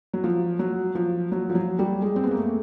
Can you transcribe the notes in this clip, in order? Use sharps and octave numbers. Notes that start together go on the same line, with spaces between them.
F#3
F3
F#3
F3
F#3
F3
F#3
G3
G#3
C4
B3
A#3
A3